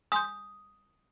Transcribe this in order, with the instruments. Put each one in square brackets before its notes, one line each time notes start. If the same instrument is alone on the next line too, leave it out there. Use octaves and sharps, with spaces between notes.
[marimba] G#5 C6 G6 [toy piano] D#6